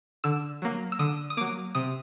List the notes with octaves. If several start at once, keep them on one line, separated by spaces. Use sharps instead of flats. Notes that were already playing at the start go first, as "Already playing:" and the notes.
D3 E6
F#3 A#3
E6
D3 D#6
D#6
F#3 A#3 D6
C3 D#6